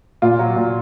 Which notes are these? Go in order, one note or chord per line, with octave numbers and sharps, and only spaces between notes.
A#2 F4
F#3
A#2